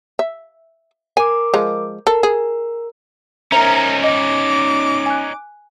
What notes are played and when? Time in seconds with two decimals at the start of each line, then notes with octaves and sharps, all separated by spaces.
0.19 E5
1.17 A#4 G#5 D6
1.54 F3 G#3
2.07 A4 A#4
2.23 G#4
3.52 C#4 D#4 A#4 C5 E5 A#5
4.04 D#5 D6 A#6
5.06 G#5 F#6